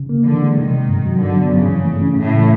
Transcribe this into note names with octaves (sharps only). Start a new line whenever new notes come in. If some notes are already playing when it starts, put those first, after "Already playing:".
Already playing: C#3
A#3
D3 E3
G#3
C3 D#3
C3
G2
F#3
D3 F#3
B3
G2 C#3
E3
A3
C#4
A2 C#3
E3